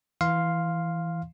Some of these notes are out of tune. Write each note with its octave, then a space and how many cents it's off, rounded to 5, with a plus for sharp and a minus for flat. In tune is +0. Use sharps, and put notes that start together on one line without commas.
E3 +0 F5 +0 C6 +0